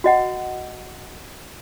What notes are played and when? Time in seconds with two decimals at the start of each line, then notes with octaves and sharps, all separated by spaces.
0.04 F#4 D#5 F#5